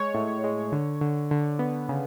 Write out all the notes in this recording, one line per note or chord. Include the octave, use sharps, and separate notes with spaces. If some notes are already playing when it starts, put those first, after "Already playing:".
Already playing: G#3 C#5
A2
G#3
D3
D3
D3
B3
C#3